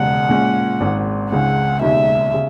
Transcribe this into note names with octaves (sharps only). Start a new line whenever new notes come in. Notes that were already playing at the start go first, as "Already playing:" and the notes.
Already playing: E1 D#2 C#3 G#3 F#5
A#2 G#3 C#4
G#1 G#2 D#3
C#2 C#3 G#3 D#4 F#5
E1 D#2 C#3 G#3 D#4 E5
C#3